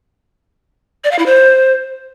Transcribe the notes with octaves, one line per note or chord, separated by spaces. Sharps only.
D5
F5
E4
C5